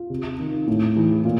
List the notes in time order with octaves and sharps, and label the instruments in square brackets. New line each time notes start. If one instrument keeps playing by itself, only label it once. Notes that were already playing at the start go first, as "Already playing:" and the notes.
Already playing: [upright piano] F4
C3
D#3
A2
E3
A#2